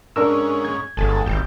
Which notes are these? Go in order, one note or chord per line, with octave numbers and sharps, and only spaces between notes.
G#2 C#4 D4 A#4 E6
G#6
G1 G#3 A4
G#1 G4